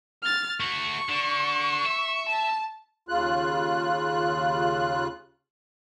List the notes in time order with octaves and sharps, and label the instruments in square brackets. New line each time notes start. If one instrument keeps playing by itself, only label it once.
[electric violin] F6 A6
[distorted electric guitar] A3 F#4 [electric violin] C#6
[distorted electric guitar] D3
E5
[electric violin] A5
[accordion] D#2 C#3 F4 F#6